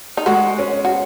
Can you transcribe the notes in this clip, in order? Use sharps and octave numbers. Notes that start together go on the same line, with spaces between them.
D#4
G#3 F#4
C#4
F#4